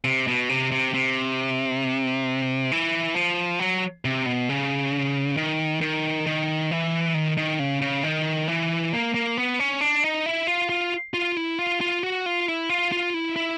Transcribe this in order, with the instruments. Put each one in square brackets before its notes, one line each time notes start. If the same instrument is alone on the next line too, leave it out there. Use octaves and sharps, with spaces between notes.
[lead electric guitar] C3
B2
C3
C3
C3
E3
F3
F#3
C3
B2
C#3
D#3
D#3
D#3
E3
D#3
D#3
C#3
C#3
D#3
E3
A#3
A#3
B3
C#4
D4
D#4
E4
F4
F4
F4
E4
F4
F4
F#4
F4
E4
F4
F4
E4
E4